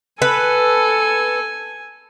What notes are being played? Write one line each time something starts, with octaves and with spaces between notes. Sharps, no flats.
A4 B4 G#5